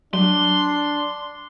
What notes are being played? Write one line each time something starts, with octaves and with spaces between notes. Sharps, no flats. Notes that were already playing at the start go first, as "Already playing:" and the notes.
F#3 D4 C6